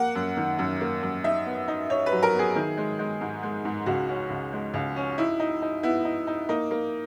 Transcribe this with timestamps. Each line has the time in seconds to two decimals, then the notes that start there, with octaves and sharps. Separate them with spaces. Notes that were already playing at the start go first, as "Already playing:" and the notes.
Already playing: A#3 F#5
0.15 F#2
0.37 D#3
0.59 F#2
0.81 A#3
1.02 F#2
1.24 D#4 E5
1.46 B3
1.68 D#4
1.90 D#4 C#5
2.06 B4
2.12 F#3
2.23 A#4
2.34 B3
2.39 G#4
2.56 D#3
2.77 G#3
2.99 G#3
3.21 G#2
3.43 G#3
3.65 G#2
3.86 C#2 F#4
4.09 C#4
4.30 C#2
4.53 G#3
4.74 C#2
4.96 C#4
5.18 D#4 E4
5.40 D#4
5.62 D#4
5.83 B3 E4
6.05 D#4
6.27 D#4
6.49 A#3 D#4
6.71 A#3